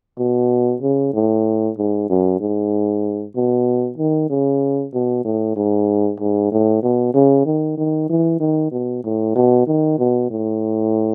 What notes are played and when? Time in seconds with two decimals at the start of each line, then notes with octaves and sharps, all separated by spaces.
0.19 B2
0.82 C#3
1.14 A2
1.78 G#2
2.10 F#2
2.41 G#2
3.36 B2
3.98 D#3
4.30 C#3
4.94 B2
5.25 A2
5.56 G#2
6.20 G#2
6.52 A2
6.83 B2
7.14 C#3
7.46 D#3
7.77 D#3
8.10 E3
8.40 D#3
8.72 B2
9.04 A2
9.36 B2
9.67 D#3
9.99 B2
10.30 A2